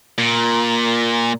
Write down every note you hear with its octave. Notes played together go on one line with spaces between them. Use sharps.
A#2